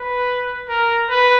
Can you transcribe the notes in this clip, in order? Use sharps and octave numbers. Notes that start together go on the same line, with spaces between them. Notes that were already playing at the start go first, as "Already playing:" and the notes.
Already playing: B4
A#4
B4